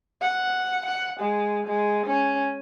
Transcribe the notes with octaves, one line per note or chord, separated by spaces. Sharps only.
F#5
F#5
G#3
G#3
C#4